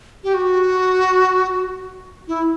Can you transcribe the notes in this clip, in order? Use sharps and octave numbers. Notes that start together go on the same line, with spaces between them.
G4
F#4
E4